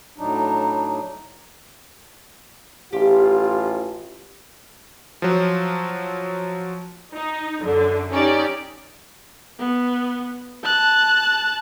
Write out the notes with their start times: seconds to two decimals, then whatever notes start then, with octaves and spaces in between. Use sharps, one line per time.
0.18 A2 F#3 D4 D#4
2.93 A1 F4 G4
5.22 F3 F#3
7.13 D#4
7.63 F#2 D3
8.11 C#4 D#4 G4 D5
9.59 B3
10.64 A5 F#6